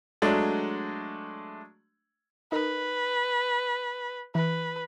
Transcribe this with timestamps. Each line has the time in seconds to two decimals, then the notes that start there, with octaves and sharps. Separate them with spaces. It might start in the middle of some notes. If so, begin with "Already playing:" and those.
0.22 F#3 G#3 A3 D4
2.52 D#4 A#4 B4
4.35 E3 B4